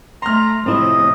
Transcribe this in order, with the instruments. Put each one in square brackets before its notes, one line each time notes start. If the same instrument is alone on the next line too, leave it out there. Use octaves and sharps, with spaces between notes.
[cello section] A3 [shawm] A#5 [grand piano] C6 F6
[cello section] A2 C3 F3 [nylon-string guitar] C4 E4 [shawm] D#5